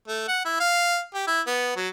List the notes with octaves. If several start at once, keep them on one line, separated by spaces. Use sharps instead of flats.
A3
F#5
E4
F5
G4
E4
B3
F#3